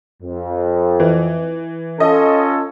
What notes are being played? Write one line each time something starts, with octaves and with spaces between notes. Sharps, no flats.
F2
E3
C#4 F4 A4 D#5